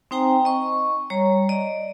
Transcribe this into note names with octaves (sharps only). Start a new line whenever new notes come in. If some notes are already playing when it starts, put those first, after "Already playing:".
C4 D#4 C5 G5 G#5 A#5
D#5 C#6
G3 C#5 A#5
D5 D#5